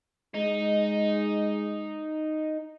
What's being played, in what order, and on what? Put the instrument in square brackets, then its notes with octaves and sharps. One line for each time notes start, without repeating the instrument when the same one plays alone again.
[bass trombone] G#3 [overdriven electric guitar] D#4